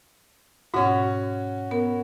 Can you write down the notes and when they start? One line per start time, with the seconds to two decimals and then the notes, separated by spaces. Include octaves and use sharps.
0.74 G#2 B2 C#4 F#4 F#5
1.71 B3 A#4